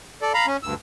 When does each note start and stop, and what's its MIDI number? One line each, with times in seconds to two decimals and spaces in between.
0.22 0.33 69
0.22 0.33 74
0.34 0.46 77
0.34 0.46 82
0.34 0.46 83
0.47 0.57 61
0.63 0.74 38
0.63 0.74 43
0.63 0.74 88